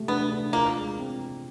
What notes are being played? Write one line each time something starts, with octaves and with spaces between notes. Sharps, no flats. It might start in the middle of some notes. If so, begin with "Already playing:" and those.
Already playing: A3 G4
B3 D4
D4
A#3 F4
G#3
C4